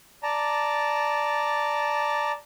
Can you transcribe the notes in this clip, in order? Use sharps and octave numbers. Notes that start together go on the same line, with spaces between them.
D5 A5 A#5